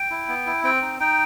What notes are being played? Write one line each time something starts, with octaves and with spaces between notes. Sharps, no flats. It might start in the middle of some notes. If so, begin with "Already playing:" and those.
Already playing: G5
E4
B3
E4
C4 G5
D#4
D#4 G5